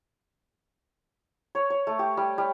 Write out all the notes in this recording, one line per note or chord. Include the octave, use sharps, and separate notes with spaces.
C#5
C#5
A3
G4
G3
G3